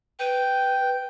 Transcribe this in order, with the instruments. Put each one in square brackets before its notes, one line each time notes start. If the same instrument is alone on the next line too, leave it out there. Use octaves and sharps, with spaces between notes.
[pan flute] B4 [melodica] G5